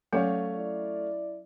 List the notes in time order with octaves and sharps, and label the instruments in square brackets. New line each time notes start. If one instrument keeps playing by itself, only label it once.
[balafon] F#3 C#4 F#5 [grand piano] A3 C#5 F5
[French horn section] E4 D5